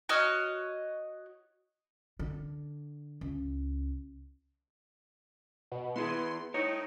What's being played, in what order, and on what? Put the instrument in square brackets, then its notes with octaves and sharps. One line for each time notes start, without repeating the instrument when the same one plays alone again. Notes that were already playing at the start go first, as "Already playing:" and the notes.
[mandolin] F#4 C#5 D#5 F6
[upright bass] D3
C#2
[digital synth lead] B2
[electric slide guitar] B3 E4 G#4 [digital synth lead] C6
[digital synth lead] D#4 [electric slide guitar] E4 C#5